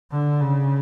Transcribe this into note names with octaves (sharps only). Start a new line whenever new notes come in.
D3
C#3